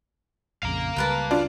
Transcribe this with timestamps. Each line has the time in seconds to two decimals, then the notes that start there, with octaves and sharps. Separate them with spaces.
0.63 A#1 F2 C#3 F5 A#5
0.96 C#2 G3 A#4 B4 A5
1.31 D4 F4